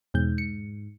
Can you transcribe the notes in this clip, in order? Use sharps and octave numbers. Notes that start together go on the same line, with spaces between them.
E2 G#2 B2 G6
C#7